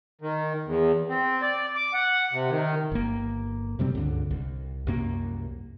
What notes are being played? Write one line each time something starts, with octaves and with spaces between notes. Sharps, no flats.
D#3
E2
C4
D5
D6
F#5
C3
D#3
G1 A#3
F#2 C3 G3 C4
C#2 G2 D3
C2
C2 F#2 A#3